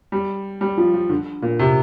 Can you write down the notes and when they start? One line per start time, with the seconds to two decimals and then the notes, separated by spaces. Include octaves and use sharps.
0.12 G3
0.61 G3
0.77 F3
0.94 F3
1.09 D3
1.42 A#2
1.59 C3